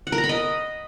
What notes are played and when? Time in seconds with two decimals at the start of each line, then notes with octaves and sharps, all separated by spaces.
0.07 F#5
0.12 A#4
0.18 A#5
0.24 B5
0.29 D#5